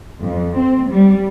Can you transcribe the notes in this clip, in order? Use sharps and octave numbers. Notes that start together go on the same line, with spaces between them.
F2
C4
G3